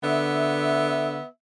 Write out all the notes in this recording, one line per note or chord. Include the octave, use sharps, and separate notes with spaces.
D3 B3 E5